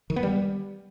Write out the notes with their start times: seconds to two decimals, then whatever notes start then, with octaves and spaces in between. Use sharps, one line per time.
0.10 D#3
0.16 B3
0.23 G3